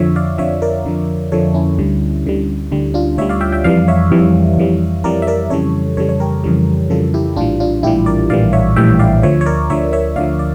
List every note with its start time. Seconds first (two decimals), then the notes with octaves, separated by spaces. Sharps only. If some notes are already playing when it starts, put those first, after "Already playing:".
Already playing: F2 D3 F3 C#5 E5
0.16 D5 F5
0.38 F2 D3 F3 C#5 E5
0.62 A#4 D5
0.85 F2 D3 F3
1.32 F2 D3 F3 A4 C#5
1.54 C#4 E4
1.78 D2 D3 G3
2.26 D2 D3 G3
2.72 D2 D3 G3
2.94 D4 F4
3.18 D2 D3 G3 C#5 E5
3.29 D5 F5
3.41 E5 G5
3.52 E5 G5
3.64 F2 E3 G3 D5 F5
3.88 C#5 E5
4.11 F2 E3 G3
4.57 F2 E3 G3
5.04 F2 E3 G3 A#4 D5
5.22 E5
5.27 A#4 D5
5.50 F2 C#3 E3 G3 A4 C#5
5.97 F2 C#3 E3 G3 A4 C#5
6.09 C#5
6.20 G4 A#4
6.44 F2 C#3 E3 G3
6.90 F2 C#3 E3 G3 F4 A4
7.14 E4 G4
7.36 A#1 A2 E3 G3 D4 F4
7.60 D4 F4
7.83 A#1 A2 E3 G3 E4 G4
8.06 A#4 D5
8.30 A#1 A2 E3 G3 D5 F5
8.53 C#5 E5
8.76 A#1 A2 E3 G3 E5 G5
8.99 D5 F5
9.23 D2 D3 F3 C#5 E5
9.41 C#5
9.46 A#4 D5
9.70 D2 D3 F3 C#5 E5
9.93 C#5 E5
10.16 D2 D3 F3 D5 F5
10.39 D5